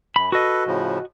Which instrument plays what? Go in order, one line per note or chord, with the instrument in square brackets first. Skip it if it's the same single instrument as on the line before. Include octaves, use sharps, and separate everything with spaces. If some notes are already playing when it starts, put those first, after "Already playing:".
[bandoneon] F#2 [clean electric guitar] B5
[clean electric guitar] F#4 D#5 [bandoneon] A4 B4
[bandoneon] A2 C#3 F3